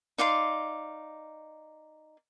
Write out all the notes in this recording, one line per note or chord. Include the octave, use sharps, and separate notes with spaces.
D#4 D5 F5 C6